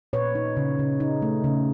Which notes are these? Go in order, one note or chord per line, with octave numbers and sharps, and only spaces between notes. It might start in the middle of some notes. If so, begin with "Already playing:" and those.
A#2 B4 C#5
D#4
C#3
C#3
D#4
A3
C#3